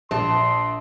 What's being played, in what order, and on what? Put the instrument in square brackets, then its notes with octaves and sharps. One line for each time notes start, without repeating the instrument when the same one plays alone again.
[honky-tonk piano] A#1 [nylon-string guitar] A5 [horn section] C6